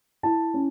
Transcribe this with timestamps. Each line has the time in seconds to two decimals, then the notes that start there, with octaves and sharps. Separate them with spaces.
0.23 E4 A5
0.54 C#4